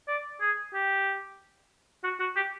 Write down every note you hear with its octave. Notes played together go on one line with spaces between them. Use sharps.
D5
G#4
G4
F#4
F#4
G4